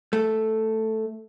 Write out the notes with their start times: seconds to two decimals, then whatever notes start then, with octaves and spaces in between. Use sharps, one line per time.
0.13 A3